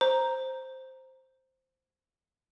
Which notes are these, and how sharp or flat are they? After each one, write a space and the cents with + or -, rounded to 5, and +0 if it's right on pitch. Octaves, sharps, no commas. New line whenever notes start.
C5 +0 A#5 +0